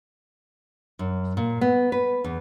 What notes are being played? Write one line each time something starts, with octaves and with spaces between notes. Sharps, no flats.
F#2
A#2
B3
B4
E2